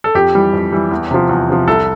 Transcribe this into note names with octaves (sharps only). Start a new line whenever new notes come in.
A4
F2 G4
E3 G3
F2
E3 G3
E2
C3 F3
E2
C3 F3
C2 A4